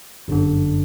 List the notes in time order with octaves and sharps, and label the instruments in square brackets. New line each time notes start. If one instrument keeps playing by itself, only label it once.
[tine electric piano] G1 F#2 D3